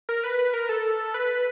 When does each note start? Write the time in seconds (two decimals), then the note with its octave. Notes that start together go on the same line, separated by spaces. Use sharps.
0.09 A#4
0.24 B4
0.39 B4
0.54 A#4
0.69 A4
1.14 B4